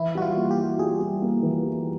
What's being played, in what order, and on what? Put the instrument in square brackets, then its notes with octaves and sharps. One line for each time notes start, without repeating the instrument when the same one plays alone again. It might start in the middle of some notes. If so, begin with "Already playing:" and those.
Already playing: [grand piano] E3 [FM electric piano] E4
[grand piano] G3 [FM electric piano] F#4
[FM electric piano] F4
[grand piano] A#3
[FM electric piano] G4
[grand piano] G3
[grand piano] G3 [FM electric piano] G#4
[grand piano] G3
A#3
E3
G3